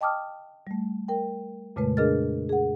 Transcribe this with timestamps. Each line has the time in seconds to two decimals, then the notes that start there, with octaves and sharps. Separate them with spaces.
0.01 D#5 G5 A5 D6 D#6 F6
0.67 G3 A3
1.08 A#4 G5
1.76 F2 A#2 C#3 G#3 A3 B4
1.97 D4 G#4 A#4 D#5 F6 A6
2.49 G#4 F#5